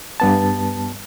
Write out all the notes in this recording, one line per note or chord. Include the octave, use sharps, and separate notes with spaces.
G2 B3 A5